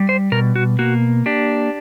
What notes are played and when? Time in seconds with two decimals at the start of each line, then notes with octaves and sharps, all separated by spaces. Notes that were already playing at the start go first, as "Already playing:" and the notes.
Already playing: G3
0.09 C5
0.32 B2 A#4
0.56 F#4
0.79 A#3 F#4
1.26 D4 G4